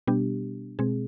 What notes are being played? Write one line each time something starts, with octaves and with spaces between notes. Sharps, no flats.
B2 G3 B3 D4 G4
B2 G#3 C4 G#4